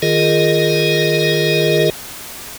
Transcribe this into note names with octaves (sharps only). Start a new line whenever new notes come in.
D#3 F4 G#4 A#4 D#5